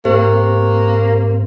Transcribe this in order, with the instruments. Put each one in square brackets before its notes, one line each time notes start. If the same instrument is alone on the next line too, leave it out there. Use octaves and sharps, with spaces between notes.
[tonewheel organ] G#2 C4 [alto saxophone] A#3 [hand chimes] G4 C5